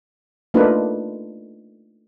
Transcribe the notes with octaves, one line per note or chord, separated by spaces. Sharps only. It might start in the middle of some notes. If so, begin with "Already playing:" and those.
A3 A#3 D4 D#4 F4 B4